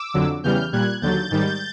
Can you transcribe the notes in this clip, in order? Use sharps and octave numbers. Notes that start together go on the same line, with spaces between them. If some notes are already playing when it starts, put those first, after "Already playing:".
Already playing: D6 E6
F2 D3 F#3
E2 C#3 E3 G3 F6 G6
A#2 G3 F#6 G#6
D#2 D3 F#3 G6 A6
G#2 D#3 G3